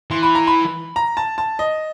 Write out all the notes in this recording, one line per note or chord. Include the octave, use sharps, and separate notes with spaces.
E3 C6
B5
A#5
B5
A#5
A5
A5
D#5